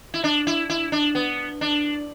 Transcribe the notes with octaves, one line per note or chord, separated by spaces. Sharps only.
E4
D4
E4
E4
D4
B3
D4